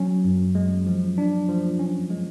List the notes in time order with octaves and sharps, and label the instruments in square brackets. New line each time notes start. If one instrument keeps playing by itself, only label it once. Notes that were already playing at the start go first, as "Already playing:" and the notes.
Already playing: [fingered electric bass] F#3 [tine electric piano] C#4
[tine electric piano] F#2
G#3
F3
D4
F3
C#4
G#3